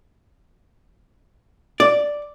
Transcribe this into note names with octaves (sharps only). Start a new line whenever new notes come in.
D5